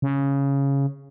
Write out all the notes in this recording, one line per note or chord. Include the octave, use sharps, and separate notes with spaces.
C#3